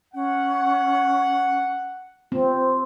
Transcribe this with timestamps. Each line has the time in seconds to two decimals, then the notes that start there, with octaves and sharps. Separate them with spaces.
0.14 C#4 F#5
2.32 C4 F4